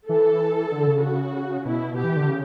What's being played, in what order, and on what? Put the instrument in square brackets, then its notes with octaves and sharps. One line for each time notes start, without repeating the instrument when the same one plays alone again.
[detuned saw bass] E3 [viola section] A4
[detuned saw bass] D3
C#3
[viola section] F#4
[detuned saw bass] B2 [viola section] E4
[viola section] G4
[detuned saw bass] E3
D3
C#3